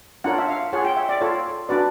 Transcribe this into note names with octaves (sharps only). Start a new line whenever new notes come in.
D4 F4 A#4 C#5 F#5
E5
F5
F4 G#4 C#5 F#5
G5
E5
D5
F4 A4 C#5
D4 F#4 B4 D5